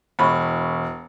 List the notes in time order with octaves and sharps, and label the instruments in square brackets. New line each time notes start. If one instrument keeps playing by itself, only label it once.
[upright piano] E1 B5 C#6